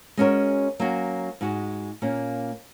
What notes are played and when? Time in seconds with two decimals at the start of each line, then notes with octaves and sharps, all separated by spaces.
0.17 G#3 C#4 F#4 A#4 C#5
0.80 F#3 A#3 C#4 F#4
1.41 G#2 G#3 F#4
2.02 A#2 A#3 C#4